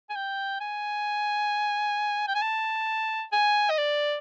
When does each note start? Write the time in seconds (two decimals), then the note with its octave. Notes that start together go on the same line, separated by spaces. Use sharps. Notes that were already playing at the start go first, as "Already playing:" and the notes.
0.10 G#5
0.16 G5
0.61 G#5
2.28 G5
2.35 G#5
2.42 A5
3.32 G#5
3.70 D#5
3.78 D5